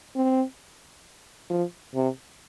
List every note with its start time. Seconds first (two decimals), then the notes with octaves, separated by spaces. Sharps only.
0.16 C4
1.50 F3
1.95 C3